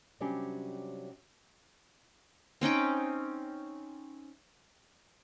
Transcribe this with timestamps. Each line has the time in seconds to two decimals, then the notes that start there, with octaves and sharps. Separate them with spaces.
0.20 C3 F#3 G3 C#4 D4 G4
2.61 C4 C#4 D#4 G5